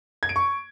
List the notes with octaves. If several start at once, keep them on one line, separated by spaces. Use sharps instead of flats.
G#6
D7
C#6